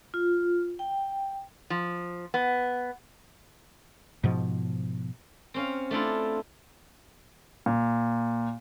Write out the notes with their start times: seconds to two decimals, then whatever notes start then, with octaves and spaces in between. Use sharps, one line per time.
0.14 F4
0.79 G5
1.70 F3
2.34 B3
4.24 G#2 B2 F3
5.54 C4 C#4 F5
5.91 A3 D4 E4 F4
7.66 A#2